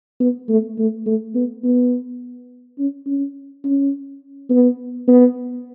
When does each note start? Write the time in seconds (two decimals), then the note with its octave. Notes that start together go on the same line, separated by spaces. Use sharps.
0.20 B3
0.49 A3
0.78 A3
1.06 A3
1.35 B3
1.64 B3
2.78 C#4
3.07 C#4
3.64 C#4
4.50 B3
5.08 B3